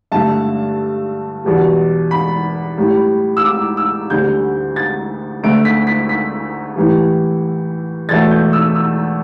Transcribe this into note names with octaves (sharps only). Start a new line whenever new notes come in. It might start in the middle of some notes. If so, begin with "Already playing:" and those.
G2 D3 A3 A5
E2 B2 G3
B5
A2 G3
E6
D6
E6
D2 D3 G3 G6
A6
D2 D3 A3 D7
B6
B6
B6
A2 E3 G3
E2 B2 A3 A6
G6
E6
E6